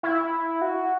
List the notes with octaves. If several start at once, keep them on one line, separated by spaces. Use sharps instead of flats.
E4
F#4